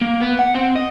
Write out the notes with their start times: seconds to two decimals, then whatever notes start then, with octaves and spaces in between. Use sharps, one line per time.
0.01 A#3
0.20 B3
0.39 F#5
0.55 C4
0.76 D#5